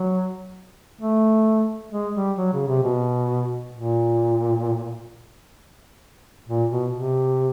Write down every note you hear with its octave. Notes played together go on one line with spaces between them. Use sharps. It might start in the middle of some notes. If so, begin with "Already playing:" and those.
Already playing: F#3
A3
G#3
G3
F#3
C#3
C3
B2
A#2
A#2
B2
C3